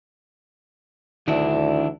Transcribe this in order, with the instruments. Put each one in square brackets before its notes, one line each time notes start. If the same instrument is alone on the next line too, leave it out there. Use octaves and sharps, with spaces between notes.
[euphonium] D2 [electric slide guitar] D#3 D4 E4